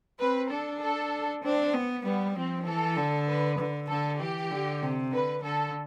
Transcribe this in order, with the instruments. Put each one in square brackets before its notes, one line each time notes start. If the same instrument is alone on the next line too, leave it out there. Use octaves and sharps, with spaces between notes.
[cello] C4 [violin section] B4
[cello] D4 [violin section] A4
[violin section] A4
[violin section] C4 [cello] D4
[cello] B3
[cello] G3 [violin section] B3
[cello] F3 [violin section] C4
[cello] E3 [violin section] A4
[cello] D3
[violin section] B4
[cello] D3
[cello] D3 [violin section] A4
[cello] E3 [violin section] G4
[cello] D3
C3
[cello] D3 [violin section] B4
[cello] D3 [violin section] A4